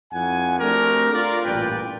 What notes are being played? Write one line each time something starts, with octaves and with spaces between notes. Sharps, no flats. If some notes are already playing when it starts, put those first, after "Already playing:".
F2 E4 F#5 G#5
A3 C4 D4 F#4 G4 A#4
F4 A#4 D5
A1 G2 A#2 B4 D5 G5